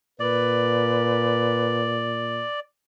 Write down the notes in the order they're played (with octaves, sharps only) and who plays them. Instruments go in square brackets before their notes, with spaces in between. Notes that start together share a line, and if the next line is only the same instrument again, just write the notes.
[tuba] A#2 [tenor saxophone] B4 [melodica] D5